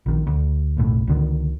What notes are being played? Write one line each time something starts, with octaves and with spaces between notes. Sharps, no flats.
A#1 D#3
D2
F#1 B1 A2
C#2 D3 D#3